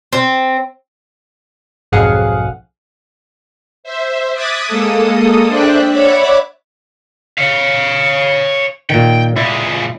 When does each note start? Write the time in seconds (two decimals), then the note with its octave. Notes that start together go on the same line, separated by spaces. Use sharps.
0.13 C4
1.92 B1 F2 G#2 G#4 F5 F#5
3.84 C5 E5
4.34 D6 D#6 F#6 G#6 A6 B6
4.66 G#3 A#3 A4 D#6
5.48 D4 C5 D5 E5 G5 F#6
5.91 C#5 D5 E5 F#5 B5 D6
7.38 C#5 F5
8.90 A#2 D#3 G5
9.36 A#2 G#3 E4